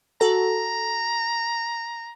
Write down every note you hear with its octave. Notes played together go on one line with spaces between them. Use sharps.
F#4 A4 A#5